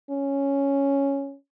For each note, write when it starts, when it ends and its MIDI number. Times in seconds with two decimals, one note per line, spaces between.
0.10 1.35 61